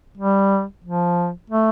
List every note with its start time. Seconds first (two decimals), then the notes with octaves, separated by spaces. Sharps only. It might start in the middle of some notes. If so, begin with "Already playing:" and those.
0.18 G3
0.85 F3
1.50 A3